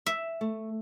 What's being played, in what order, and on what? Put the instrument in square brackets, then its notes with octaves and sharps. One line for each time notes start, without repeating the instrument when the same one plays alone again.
[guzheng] E5
[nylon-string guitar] A3